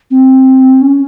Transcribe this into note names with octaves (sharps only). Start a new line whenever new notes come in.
C4
C#4